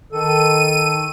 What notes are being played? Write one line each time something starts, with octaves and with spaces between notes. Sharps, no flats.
D#3 A4 D#7